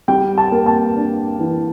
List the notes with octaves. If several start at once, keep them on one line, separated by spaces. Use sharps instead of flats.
G3 G5
A5
A#3
A5
D4
E3